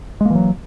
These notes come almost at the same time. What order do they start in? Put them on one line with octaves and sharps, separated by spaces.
G#3 A#3 E3 F#3